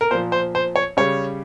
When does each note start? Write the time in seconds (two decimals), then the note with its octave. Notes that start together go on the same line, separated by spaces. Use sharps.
0.01 A#4
0.11 A#2 F3 C5
0.32 C5
0.55 C5
0.76 C#5
0.97 C#3 G3 C#5